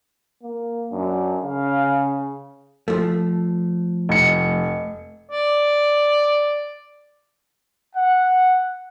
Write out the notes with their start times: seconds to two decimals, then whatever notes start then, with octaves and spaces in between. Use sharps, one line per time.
0.43 A#3
0.92 F#2 D4
1.43 C#3 F5
2.88 F3 A3
4.09 F1 C#7
5.31 D5
7.94 F#5